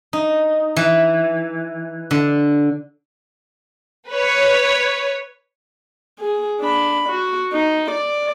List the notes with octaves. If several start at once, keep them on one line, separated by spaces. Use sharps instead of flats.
D#4
E3
D3
B4 C#5
G#4
D4 B5
F#4
D#4
D5